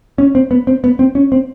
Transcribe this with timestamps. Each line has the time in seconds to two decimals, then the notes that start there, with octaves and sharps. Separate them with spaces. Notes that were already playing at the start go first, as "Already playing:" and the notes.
0.18 C#4
0.35 C4
0.51 B3
0.67 C4
0.84 B3
0.99 C4
1.15 C#4
1.32 C4